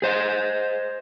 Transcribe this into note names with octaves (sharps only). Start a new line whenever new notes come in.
G#4 C5 D#5